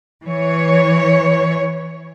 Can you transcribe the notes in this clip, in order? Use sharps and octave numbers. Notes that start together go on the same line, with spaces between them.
E3 C#5